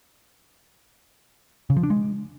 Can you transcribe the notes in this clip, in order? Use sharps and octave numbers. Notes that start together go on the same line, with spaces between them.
C#3
F3
D4
G#3